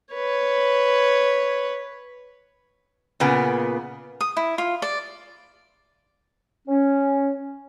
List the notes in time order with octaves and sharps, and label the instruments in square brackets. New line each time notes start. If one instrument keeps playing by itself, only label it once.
[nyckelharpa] B4 C#5
[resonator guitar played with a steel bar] A#2 C#3 B3
[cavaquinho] D#6
E4
F4
D5
[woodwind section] C#4